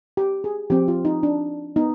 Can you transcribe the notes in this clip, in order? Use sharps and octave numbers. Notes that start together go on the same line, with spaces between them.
G4
G#4
F3 C4 G4
F4
D#4
D4
B3 D#4